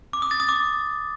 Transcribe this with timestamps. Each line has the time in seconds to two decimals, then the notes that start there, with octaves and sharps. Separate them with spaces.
0.13 D6
0.22 D#6
0.31 A6
0.40 D#6
0.49 D6